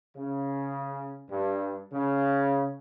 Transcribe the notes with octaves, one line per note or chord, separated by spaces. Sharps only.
C#3
G2
C#3